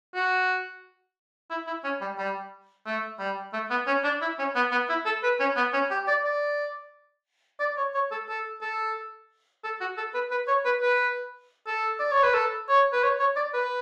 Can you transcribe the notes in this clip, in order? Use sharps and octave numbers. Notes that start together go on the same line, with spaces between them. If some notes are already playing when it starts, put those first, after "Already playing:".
F#4
E4
E4
C#4
G3
G3
A3
G3
A3
B3
C#4
D4
E4
C#4
B3
B3
E4
A4
B4
C#4
B3
C#4
G4
D5
D5
D5
C#5
C#5
A4
A4
A4
A4
F#4
A4
B4
B4
C#5
B4
B4
A4
D5
C#5
B4
A4
C#5
B4
C#5
C#5
D5
B4